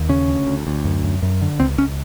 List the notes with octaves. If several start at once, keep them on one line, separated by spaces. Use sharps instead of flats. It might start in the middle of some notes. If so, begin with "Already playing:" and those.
Already playing: D#2
C#3 C#4
D2
D2
D2
F#2
F#2
F#2
D3
C#2 C4
C#2 C#4